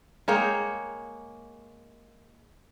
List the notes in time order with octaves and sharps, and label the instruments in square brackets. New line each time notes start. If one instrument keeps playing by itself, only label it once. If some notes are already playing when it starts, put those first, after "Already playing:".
[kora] G#3 A#3 C#5 G5